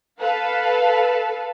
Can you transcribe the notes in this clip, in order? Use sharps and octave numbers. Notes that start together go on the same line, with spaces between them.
A4 B4 F5